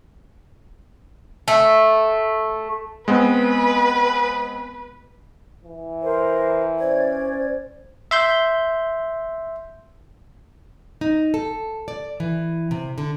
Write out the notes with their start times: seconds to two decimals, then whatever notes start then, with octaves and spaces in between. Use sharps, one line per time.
1.48 A3
3.08 G#3 B3 C4 B4
5.65 E3
6.03 A#4 C5
6.79 C#4 C5 D5 G#6
8.11 E5 C6 G6
11.01 D#4
11.34 A4
11.88 D5
12.20 E3
12.71 C3
12.98 D3